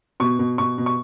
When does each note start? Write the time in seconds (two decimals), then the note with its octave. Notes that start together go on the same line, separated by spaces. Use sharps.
0.20 B2 C#6
0.39 B2
0.58 B2 C#6
0.78 B2
0.86 C#6